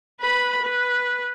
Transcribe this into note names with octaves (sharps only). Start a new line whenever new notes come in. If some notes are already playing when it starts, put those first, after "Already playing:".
B4 B5
B4